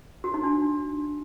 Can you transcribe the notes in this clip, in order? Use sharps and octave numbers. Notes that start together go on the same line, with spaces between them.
F#4
D#4
D4